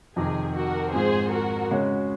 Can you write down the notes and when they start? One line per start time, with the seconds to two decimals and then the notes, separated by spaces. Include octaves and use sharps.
0.16 F2 C3 D#3 G#4
0.55 F#4 A#4
0.93 G#2 F3 C4 G#4 C5
1.32 F#4 A#4
1.71 C#3 G#3 C#4 F#4